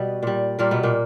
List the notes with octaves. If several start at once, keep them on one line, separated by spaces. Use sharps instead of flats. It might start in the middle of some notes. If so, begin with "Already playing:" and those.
Already playing: B2 G3 B3 B4
A#2 G3
A#2 G3 A#3 A#4
B2 B3
A#2 A#3